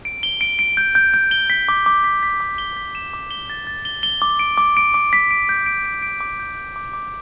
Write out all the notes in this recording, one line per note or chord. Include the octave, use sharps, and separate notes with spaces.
D7
G7
D7
D7
G6
G6
G6
G7
B6
D6
D6
B6
B6
D6
G7
B6
E7
D6
G7
A6
A6
G7
G7
D6
D7
D6
D7
D6
B6
D7
G6
D7
D7
D7
D6
G6
G6
D6
D6